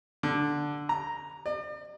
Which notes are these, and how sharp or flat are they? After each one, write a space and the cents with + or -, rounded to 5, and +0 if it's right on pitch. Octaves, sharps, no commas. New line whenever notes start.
D3 +0
A#5 +0
D5 +45